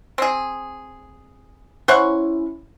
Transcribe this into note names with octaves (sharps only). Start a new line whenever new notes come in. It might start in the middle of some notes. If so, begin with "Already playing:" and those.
C4 G#4
C#4 E4 C5 F#5 C#6